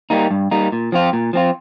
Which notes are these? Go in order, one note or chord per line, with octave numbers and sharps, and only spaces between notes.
G3 A#3 D#4
G2
G3 A#3 D#4
A#2
F3 C4 F4
A#2
F3 C4 F4